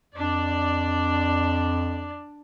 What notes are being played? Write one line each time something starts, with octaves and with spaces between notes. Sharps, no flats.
F2 D4 D5